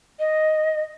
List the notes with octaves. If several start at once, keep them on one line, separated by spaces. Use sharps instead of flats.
D#5